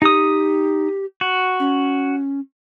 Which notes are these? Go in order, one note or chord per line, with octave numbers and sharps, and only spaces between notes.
D#4 G4 D#6
F#4
C#4